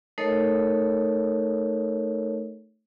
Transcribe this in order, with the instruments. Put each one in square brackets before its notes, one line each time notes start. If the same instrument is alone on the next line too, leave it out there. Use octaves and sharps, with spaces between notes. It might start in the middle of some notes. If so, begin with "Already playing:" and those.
[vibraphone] A3 D#4 A4 A#4 C#5 D#5